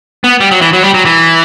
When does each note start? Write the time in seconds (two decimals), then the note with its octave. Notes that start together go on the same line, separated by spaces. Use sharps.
0.24 B3
0.40 G3
0.51 F#3
0.61 E3
0.73 F#3
0.83 G3
0.94 F#3
1.05 E3